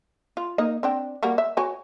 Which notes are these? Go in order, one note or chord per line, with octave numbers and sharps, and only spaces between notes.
F4
A#3 D#4 D#5
C4 D4 G5
G3 A#3 F#4
E5
F#4 C#5 G#5